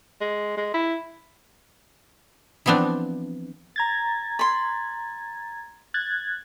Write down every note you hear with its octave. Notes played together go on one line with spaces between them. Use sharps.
G#3
G#3
E4
E3 F3 B3 C4 D4
A#5 G#6 A6
B5 C6
F#6 G#6 A6